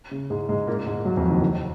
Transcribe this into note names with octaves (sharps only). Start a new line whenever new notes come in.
C#3
G#2 G#3
G#2 G#3
A#2 A#3
G#2 G#3
F#2 F#3
F2 F3
D#2 D#3
D#2 D#3